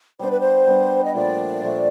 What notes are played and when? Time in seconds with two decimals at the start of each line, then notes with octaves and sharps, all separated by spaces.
0.19 G3 B3 D4 C5
0.30 B4
0.39 C5
0.67 G3 B3 D4
1.04 D#5
1.14 A#2 F3 A3 D5
1.62 A#2 F3 A3